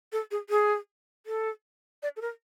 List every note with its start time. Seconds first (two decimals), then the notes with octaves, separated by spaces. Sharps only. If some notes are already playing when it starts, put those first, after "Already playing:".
0.13 A4
0.31 G#4
0.50 G#4
1.26 A4
2.03 D5
2.16 A4
2.22 A#4